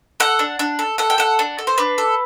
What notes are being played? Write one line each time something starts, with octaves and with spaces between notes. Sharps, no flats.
A4 F#5
D4
D4
A4
A4 F#5
G5
A4 F#5
D4
A4
C5
D4 B4
A4